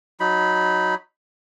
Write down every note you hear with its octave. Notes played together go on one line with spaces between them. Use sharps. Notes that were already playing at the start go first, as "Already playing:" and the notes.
F#3 D#4 B5